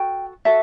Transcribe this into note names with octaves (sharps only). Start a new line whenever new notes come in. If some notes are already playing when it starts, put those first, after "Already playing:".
Already playing: F#4 A4 G5
F#4 A4 E5